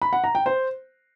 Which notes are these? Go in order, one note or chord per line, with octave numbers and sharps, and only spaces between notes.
B5
F#5
A#5
G5
C5